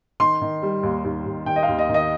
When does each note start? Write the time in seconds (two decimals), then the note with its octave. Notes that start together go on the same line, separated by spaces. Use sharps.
0.20 D#3 C6
0.41 D#3
0.63 G3
0.83 D#2
1.05 D#2
1.26 D#2
1.46 D#3 G5
1.56 D#5
1.63 F5
1.68 D#2
1.79 D#5
1.89 D#3
1.94 D#5